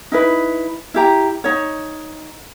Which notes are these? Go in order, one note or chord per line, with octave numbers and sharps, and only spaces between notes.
D#4 E4 B4
E4 G4 A#5
D#4 C#5